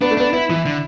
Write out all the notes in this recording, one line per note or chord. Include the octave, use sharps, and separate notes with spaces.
B3 D4
A3
B3 D4
B3 E4
E3 E4
D3